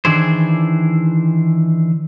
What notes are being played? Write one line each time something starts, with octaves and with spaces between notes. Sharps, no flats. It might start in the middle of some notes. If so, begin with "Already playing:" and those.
D#3 E3 D4 E4 G#4 C5